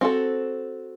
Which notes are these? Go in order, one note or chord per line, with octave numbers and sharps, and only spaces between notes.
C4 F#4 A4